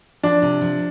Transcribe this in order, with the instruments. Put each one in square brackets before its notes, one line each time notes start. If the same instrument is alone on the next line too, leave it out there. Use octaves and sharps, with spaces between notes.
[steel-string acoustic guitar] F3 [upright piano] D4
[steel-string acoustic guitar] C3
F3